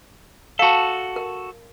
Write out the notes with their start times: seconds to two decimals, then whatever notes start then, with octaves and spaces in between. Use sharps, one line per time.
0.59 F#4 A4 F5 A5
1.16 A#4